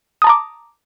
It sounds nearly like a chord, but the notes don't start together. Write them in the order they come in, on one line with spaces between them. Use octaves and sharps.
D#6 A5 A#5 D6